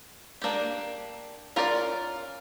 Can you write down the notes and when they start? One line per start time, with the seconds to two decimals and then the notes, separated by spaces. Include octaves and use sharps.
0.42 A#3 D4 G4
1.56 C#4 F4 A#4 D5